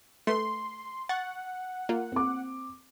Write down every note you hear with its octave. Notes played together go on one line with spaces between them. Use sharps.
A3 B4 C6
F#5 C#6 A6
A#3 F4
C4 D6